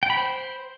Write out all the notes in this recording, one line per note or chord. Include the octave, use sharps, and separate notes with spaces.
G5
B5
C5